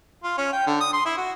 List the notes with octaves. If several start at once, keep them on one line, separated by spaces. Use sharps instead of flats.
F4
C#4
G5
D3
D#6
C6
E4
F#4